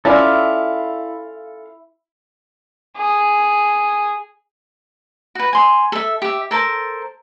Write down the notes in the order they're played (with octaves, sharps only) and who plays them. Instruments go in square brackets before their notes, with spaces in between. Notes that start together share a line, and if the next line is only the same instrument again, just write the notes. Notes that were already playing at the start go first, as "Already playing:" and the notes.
[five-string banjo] C#4 F4 D5 [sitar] E4 [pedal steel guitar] A4 F5
[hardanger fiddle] G#4
[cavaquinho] F#4 B4
G#5 C6
A4 E5
G4 E5
A4 A#4 C5 A5